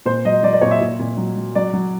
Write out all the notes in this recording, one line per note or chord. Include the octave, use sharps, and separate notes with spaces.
A#2 C5
F#3 D#5
F#3 D5
D5
A#2 C#5
E5
A#2
A#2
F#3
F#3
F#3 D5
F#3